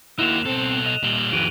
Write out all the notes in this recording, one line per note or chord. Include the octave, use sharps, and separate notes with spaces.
A#3 D#4 E4 F#4 F#6 E7 F7
B2 C4 A4
D#5 F7
A#2 G3 E7 F#7 G7
F2 D#3 F#4 G#4 D7 D#7